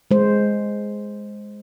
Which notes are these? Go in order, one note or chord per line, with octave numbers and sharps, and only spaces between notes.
G#3 C5